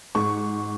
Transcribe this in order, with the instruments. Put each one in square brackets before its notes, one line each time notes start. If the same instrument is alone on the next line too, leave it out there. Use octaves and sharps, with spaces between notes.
[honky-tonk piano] G#2 C#6